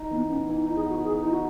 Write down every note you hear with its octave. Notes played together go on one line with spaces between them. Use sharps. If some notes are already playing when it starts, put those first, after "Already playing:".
Already playing: D#4
E3 B3
B3 C#4
E3 D#4
E4
D#4
G#4
B3 F#4
E3 G#4
D#4 E4
F#4